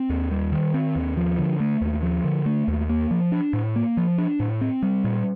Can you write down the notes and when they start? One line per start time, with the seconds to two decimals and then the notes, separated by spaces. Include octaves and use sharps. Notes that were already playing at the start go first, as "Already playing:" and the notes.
Already playing: C4
0.09 D#2
0.31 G3
0.52 D#3
0.74 C4
0.96 D#2
1.17 F3
1.38 D3
1.60 A3
1.81 D#2
2.03 F3
2.24 D3
2.46 A3
2.68 D#2
2.89 A#3
3.11 F3
3.32 D4
3.53 A2
3.76 A#3
3.97 F3
4.18 D4
4.40 A2
4.61 C4
4.82 G3
5.04 A#2